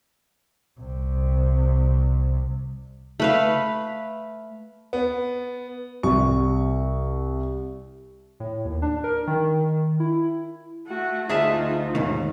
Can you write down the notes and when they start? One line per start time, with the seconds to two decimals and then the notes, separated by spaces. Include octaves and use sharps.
0.80 C2 C3
3.20 A3 B4 F5
4.93 B3
6.03 C2 C#6
8.40 A2
8.65 D#2
8.82 D4
9.04 A#4
9.27 D#3
10.00 E4
10.87 A3 F#4
11.29 D2 D#4 F4 G#4 E5 A5
11.95 D#2 G#2 B2 D#3